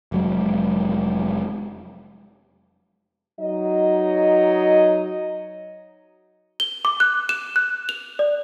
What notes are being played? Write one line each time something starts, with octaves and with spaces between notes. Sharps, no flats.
F1 F#3 G#3
F#3 D#4 D#5
G7
D6
F#6
E7
F#6
F7
D5